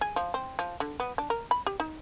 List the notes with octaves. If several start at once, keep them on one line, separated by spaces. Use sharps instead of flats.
G#4
F3
C4
F3
D3
B3
D4
A#4
B5
G4
D#4